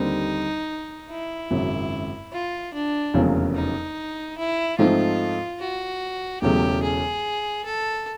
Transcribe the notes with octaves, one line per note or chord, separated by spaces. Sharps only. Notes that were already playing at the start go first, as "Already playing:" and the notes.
Already playing: D#2 D3 G3 C4 D#4
E4
G#1 F#2 C#3 F#3
F4
D4
F1 E2 C#3 F#3 A#3
D#4
E4
G#2 F3 A3 C4 D#4 F4
F#4
E1 E2 C#3 F#3 A3 G4
G#4
A4